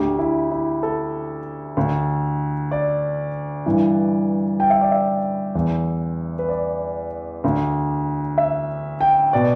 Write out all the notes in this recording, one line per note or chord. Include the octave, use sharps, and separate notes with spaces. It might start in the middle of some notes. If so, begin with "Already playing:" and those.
Already playing: D2 D3 G4
E4
E4
A4
D2 D3
D5
G2 E3
G5
E5
D5
E5
E2 E3
B4
D5
D2 D3
E5
G5
B2 D5